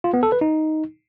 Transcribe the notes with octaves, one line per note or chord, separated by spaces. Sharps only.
F4
B3
A4
B4
D#4